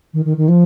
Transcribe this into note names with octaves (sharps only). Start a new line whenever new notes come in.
D#3
D#3
D#3
F3